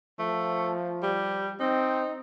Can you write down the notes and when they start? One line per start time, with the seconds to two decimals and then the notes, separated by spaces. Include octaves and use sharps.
0.19 F3 A3
1.03 G3
1.60 C4 D#4